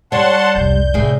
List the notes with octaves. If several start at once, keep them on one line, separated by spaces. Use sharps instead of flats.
G3 C#5 D5 F#5 A5 C6
F1 C2 G6
A2 C3 G#4